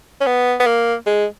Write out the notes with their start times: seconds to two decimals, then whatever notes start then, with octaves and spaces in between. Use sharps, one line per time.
0.21 C#4
0.26 B3
0.60 B3
0.66 A#3
1.06 G#3